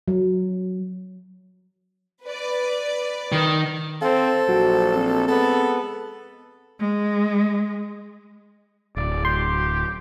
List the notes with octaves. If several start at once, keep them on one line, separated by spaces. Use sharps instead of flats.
F#3
B4 D5
D#3
C4 A4 C5 F5
A#1 F#3 F#4
C4
G#3 B3 A4 B4
G#3
D1 D5
G4 C6